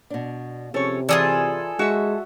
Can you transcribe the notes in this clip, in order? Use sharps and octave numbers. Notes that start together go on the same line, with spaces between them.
B2 D4
C3 F3 C#4 G#4 A4 C#5
E3 F4 G#4 A4 D5
G#3 F#4 E5